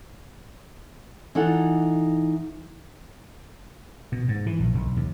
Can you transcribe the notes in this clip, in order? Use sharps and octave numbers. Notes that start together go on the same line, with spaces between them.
E3 D#4 F4 A4 F#5
B2
G#2
E3
A#1
B1
D#2